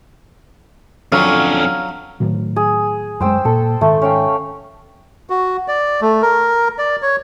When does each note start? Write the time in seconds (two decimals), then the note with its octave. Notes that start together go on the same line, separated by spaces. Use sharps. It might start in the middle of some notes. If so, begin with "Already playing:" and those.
1.12 F2 D3 F#3 C#4 F5 A#5
2.20 A2 D#3 F#3
2.56 G#4
3.20 F#2 G#3 C5 G5 E6
3.45 A#2 A4
3.81 G#2 D#3 A3
4.02 C#4 F5 G5
5.30 F#4
5.68 D5
6.01 A3
6.22 A#4
6.78 D5
7.02 C#5